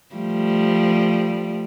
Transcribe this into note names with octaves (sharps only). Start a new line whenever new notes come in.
F3 G3 A3